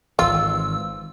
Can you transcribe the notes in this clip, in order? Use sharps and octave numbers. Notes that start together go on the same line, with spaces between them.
G#1 E3 F4 E6